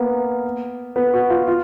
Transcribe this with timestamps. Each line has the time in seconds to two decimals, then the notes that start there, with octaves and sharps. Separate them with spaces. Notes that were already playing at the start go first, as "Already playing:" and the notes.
Already playing: A#3 B3
0.96 B3
1.14 F#4
1.30 F4
1.48 F4